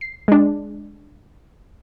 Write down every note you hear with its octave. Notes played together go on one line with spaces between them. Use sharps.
C7
G#3 D4